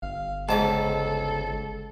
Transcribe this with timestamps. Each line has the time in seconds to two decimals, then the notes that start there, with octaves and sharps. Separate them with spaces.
0.02 G1 F5
0.49 C#2 G#2 A4 A5 D6